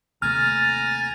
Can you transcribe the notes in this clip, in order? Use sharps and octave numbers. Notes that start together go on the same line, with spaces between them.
D#2 C3 A3 G#5 A#5 F6 A6